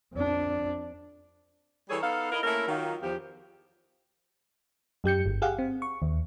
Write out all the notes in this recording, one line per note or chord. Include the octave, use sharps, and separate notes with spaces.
F2 D4
E3 G3 G#4 A4 C#5
B3 D#4 A4 F5
E4 A#4 D#5
A3 A#3 C#4 E4 A4 A#4
D#3 F#3 F4
E2 F3 G4
F#2 G4 G6 C#7
G1
G4 G#4 F5 F#5
C4
C#6
D#2